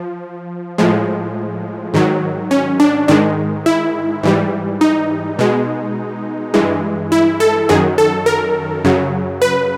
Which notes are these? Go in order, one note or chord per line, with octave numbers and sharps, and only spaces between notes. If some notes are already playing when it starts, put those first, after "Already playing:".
Already playing: F3
A2 F3 G#3
G#2 D#3 F#3
C#4
D4
G#2 D#3 G#3 D4
E4
G#2 E3 G3
D#4
B2 G#3
G2 E3 G#3
E4
A4
F#2 D#3 F#3 G#4
A4
A#4
F#2 C#3 F#3
B4